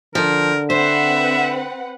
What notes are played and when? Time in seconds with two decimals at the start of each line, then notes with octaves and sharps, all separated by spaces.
0.15 D3 F3 A#4
0.70 C4 B4 C5 E5 F#5